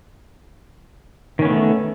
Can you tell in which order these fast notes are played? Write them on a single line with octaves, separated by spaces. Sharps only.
D#3 C#4 B3 A3